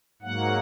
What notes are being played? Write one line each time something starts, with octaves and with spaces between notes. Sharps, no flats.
G#2 F#3 A#3 F#5